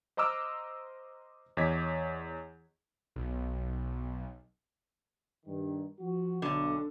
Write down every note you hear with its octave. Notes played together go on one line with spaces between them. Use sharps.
C5 D#5 A#5 D6 E6 F6
E2 C#5 D#5 D6 G#6 B6
B1
G2 D#3
F3 F#4
B1 D3